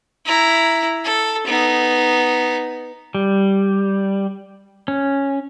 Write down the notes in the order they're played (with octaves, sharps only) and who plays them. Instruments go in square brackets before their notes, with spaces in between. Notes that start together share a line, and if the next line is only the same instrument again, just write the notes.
[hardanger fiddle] E4 A#5
A4
B3 D#4
[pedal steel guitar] G3
C#4